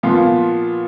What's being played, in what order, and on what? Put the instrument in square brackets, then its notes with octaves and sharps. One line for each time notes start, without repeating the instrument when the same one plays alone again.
[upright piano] A#2 F3 B3 F4